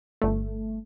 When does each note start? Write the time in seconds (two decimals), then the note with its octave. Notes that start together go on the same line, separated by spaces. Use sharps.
0.22 G1 A3